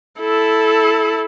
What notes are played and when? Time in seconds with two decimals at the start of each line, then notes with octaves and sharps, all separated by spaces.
0.20 E4 A4